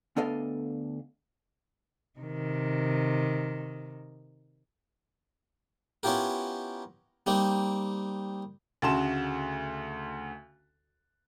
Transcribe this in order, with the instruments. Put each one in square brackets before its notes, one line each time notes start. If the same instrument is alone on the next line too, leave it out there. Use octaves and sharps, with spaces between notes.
[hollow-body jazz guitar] D2 B3 D4 A4 D#5 F5
[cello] C3 D#3
[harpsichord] B3 C#4 E4 F4 G4 A#4
G3 A#3 C4 D#4
[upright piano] D2 C#3 F#4 A5 C6 E7